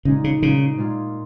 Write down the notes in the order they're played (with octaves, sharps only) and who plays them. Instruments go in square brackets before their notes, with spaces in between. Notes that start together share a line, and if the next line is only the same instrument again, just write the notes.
[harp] A#2 G#3 D#4 [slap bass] C#3
[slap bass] C#3
[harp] A#2 G#3 D#4 [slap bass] C#3
[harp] A#2 G#3 F4